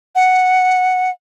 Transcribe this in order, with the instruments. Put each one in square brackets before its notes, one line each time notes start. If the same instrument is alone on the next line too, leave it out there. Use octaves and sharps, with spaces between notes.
[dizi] F#5